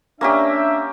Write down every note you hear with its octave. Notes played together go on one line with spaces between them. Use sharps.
A#3 C#4 D4 G4 E5